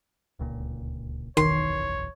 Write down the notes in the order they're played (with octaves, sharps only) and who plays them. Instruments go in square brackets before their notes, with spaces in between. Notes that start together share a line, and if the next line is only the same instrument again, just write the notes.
[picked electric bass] D1 C#2 A#2
[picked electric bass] F#1 B1 E2 [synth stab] D#3 [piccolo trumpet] C#5 [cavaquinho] C6